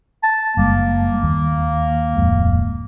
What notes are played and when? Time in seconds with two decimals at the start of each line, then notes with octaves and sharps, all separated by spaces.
0.23 A5
0.57 F#1 G3 G#3 A#3
1.23 D#2
2.17 D1 F2 G#3